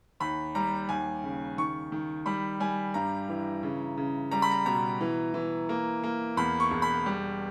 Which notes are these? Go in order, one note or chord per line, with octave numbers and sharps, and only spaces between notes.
D#2 B5
G3 A#5
D#2 G#5
C#3
D#3 C#6
D#3
G3 B5
G3 G#5
G2 A#5
E3
C#3
C#3
G3 A#5
B5
A#5
B2 A#5
E3
E3
A#3
A#3
E2 B5
C#6
E1
B5
G3